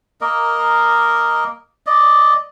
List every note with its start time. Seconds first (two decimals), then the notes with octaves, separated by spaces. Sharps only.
0.21 A#3 A#4 D#5
1.86 D5 D#5